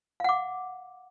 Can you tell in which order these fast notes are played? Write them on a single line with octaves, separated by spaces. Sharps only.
F5 F#5 D6